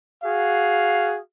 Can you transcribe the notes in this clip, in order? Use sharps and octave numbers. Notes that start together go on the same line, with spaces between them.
F#4 G#4 F5